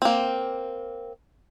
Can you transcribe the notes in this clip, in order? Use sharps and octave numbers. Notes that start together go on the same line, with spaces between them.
A#3 C4